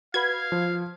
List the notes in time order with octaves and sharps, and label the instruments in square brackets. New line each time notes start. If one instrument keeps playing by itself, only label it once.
[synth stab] F#4 B4 B5 [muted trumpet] F5 [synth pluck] G#6
[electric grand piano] F3